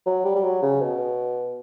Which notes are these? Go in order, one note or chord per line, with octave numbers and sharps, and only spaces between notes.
F#3
G3
G3
F#3
C#3
B2